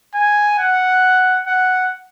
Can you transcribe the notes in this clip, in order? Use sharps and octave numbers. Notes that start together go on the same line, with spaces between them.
G#5
F#5
F#5